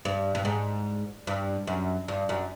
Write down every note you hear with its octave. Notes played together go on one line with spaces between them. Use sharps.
G2
G2
G#2
G2
F#2
G2
F#2